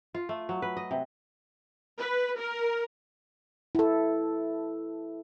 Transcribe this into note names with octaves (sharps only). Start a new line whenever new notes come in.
F4
A3
F#3
B4
D#5
C3
B4
A#4
E4 A4